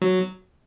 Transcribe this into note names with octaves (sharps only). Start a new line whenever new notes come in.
F#3